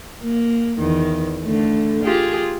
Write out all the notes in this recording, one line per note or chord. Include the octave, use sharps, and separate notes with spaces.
A#3
E2 D#3
D3 A3
F4 G4 G#4